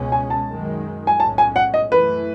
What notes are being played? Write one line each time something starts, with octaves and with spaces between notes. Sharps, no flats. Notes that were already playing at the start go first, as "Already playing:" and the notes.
Already playing: C#2 B2 G#3 C#4
G#5
A5
F#2 D#3 G#3
G#5
B1 A2 G#3 C#4 A5
G#5
F#5
D#5
F#2 E3 A3 B4